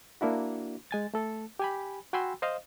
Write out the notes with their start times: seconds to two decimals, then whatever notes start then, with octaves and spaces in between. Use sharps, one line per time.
0.21 A#3 D4 E4 F#4
0.91 G#3 G#5 A6
1.14 A3 A4
1.59 G4 G#5 B5
2.13 F#4 G5 G#5 B5 C6 E6
2.42 C5 D#5 F5